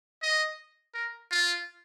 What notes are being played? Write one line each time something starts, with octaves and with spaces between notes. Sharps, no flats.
D#5
A#4
F4